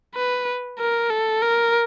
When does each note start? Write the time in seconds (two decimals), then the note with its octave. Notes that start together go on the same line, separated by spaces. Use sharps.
0.15 B4
0.79 A#4
1.10 A4
1.42 A#4